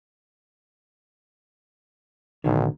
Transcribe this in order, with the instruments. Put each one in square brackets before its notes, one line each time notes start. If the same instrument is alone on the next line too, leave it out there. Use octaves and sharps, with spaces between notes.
[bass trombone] B1 [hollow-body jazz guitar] A2 D3 D#3